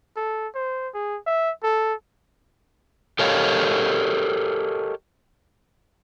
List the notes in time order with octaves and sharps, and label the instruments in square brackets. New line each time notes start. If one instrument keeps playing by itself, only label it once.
[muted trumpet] A4
C5
G#4
E5
A4
[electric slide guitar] G4 A4 A#4 C#5 D#5 F5